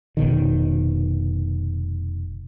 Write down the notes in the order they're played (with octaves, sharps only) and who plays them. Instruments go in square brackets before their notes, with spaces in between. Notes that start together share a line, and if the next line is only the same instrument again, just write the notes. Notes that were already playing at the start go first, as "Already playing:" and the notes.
[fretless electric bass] F1 B2 D#3